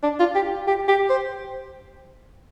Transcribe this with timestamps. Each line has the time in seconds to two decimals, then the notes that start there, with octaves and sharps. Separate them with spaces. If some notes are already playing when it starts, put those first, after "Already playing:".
0.03 D4
0.19 F4
0.35 G4
0.67 G4
0.88 G4
1.10 C5